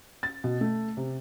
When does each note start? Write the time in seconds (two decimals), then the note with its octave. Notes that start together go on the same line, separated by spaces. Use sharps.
0.23 A6
0.44 B2
0.61 A3
0.97 C3